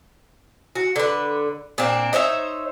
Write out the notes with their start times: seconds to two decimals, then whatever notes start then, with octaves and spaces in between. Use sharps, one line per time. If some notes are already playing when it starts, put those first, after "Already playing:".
0.75 F#4
0.96 D3 B4
1.78 A#2 C4 D4
2.13 D#4 C5 C#5 E5